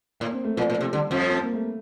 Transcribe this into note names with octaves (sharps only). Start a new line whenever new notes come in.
A2 A#3
C4
A3
A#2 F3
A#2
C3
D3 G3
F2 F3
C4
A#3
A3